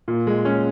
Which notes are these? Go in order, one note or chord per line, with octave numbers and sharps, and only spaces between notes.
A#2
G#3
C#4